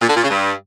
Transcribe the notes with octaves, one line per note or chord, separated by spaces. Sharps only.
A#2
D3
A#2
C#3
G2